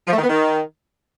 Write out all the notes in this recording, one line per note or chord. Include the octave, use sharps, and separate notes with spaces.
F3
A3
D#3
B3
D#3